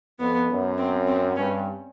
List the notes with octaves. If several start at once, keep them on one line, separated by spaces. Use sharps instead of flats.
F2 B3
F#2
C4
C4
G2 C#4